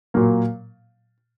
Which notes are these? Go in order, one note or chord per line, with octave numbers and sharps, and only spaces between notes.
A#2 F#3 A#3